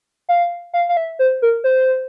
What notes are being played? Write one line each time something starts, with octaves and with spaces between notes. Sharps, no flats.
F5
F5
F5
E5
C5
A#4
C5